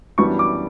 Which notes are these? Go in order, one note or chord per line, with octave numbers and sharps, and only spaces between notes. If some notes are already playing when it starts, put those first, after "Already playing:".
F#2 E3 G3 B3 D4 C#6
D6